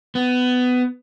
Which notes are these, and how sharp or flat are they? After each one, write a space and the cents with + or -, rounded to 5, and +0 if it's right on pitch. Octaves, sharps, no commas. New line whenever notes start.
B3 +20